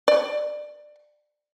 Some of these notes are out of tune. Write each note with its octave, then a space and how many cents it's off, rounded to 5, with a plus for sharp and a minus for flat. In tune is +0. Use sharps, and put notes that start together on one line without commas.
D5 +20